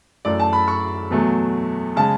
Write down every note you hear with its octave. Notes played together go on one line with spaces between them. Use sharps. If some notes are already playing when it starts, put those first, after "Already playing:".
F#2 E3 A3 D5
A5
B5
C#6
E2 B2 F#3 A3
C#3 G#3 A5